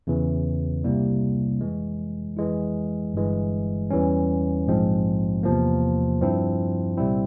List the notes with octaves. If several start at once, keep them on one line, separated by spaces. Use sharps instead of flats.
E2 C#3 E3
C2 C3 G3 A#3 E4
F2 E3 G#3
F2 E3 G#3 E4
G1 G2 E3 G#3
E2 E3 G3 C#4
A#1 G#2 F3 G#3 C4
E2 C3 F3 A#3
G2 F3 C4 E4
C2 A#2 G3 C4 E4